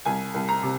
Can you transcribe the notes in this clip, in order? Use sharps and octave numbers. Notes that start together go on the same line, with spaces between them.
C2 G#5
C2
A#5
C3